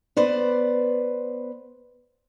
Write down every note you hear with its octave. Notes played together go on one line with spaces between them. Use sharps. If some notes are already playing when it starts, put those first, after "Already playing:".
B3 B4 C5 D5